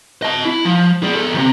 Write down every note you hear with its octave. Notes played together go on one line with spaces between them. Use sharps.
D#5 A5
E4
F3
G#4 D5
B3 A4
D#2 C3